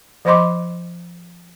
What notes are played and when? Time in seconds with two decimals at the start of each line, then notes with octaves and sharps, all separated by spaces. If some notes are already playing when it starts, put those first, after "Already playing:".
0.25 F3 C5 D#5 B5 C6 D6